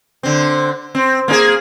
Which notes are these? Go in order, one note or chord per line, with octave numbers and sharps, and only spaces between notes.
D3 C4
C4
A#3 C#4 G#4